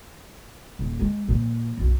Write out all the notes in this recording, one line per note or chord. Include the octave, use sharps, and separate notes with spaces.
D#1
G#3
A#2 F3
B1 F#2